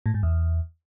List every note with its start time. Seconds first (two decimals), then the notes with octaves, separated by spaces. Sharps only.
0.06 A2
0.14 G#2
0.23 E2